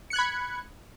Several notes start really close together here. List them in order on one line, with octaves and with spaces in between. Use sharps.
C#7 F#6 G#6 B5